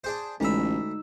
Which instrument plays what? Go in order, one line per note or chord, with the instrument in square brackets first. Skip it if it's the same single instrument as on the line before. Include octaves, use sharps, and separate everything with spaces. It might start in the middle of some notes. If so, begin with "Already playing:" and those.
[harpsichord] D4 G#4 C5
[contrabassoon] A1 [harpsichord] D2 A#5 B5 [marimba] G#3 [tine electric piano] D#4 E6